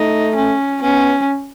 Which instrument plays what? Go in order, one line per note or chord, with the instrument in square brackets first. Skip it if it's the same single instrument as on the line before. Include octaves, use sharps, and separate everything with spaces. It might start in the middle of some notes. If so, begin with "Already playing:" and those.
Already playing: [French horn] A3 [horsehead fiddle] D#4
[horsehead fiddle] C#4
[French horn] B3 [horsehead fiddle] C#4